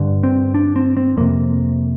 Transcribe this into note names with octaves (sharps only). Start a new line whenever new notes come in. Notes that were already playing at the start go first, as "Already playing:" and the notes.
Already playing: G2 D3
C4
D4
C4
C4
F2 C3 A#3